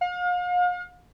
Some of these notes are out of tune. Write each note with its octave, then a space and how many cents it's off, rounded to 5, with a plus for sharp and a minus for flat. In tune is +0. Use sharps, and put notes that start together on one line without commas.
F5 +40